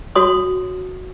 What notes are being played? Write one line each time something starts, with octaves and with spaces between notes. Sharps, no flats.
F#4 C#5 C6 D#6